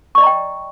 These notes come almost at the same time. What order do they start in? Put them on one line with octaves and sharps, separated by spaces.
C#6 D5 D#5 A#5 G5